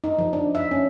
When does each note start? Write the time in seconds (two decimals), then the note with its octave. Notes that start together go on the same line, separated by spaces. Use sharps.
0.04 D#4
0.18 F3
0.33 D4
0.55 E5
0.71 C#4